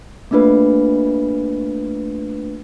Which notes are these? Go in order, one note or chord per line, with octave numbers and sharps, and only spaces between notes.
A3 A#3 D4 F4 B4